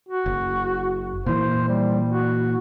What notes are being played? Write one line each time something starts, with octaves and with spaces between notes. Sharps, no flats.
F#4
F#1
A#2 E3 C5
G3
F#4